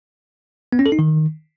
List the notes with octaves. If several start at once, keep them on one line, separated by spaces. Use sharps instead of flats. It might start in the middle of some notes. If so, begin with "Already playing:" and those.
B3
C#4
A4
D#4
D#3